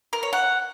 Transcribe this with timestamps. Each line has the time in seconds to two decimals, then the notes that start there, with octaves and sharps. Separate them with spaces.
0.13 A#4
0.23 C#5
0.33 F#5